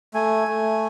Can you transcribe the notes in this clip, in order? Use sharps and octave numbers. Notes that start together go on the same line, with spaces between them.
A3 G#5
A3